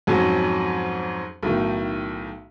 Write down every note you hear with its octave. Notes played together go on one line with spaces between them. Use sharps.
F2 G#2 F#3 C#4
B1 A2 D#3